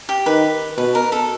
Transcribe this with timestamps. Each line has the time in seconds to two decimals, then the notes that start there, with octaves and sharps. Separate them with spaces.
0.09 G4
0.26 D#3 B4
0.77 B2 B4
0.95 A#4
1.12 A4